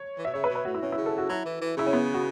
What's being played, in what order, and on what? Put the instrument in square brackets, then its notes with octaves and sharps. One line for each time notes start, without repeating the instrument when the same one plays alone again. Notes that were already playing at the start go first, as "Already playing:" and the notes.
Already playing: [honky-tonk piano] C#5
[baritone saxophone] E3
[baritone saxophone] B2 [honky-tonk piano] E5
[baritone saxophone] C#3 [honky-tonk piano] C#5
[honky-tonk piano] B4
[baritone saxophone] B2
[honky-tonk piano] B4
[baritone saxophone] A2 [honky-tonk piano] F#4
[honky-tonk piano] E4
[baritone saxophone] B2 [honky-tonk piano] C#4
[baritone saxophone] C#3 [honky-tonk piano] E4
[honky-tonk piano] A4
F#4
[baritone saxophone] F#3 [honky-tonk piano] E4
[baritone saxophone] E3
E3
[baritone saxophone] C#3 [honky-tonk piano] E4
[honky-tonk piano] C#4
B3
F#4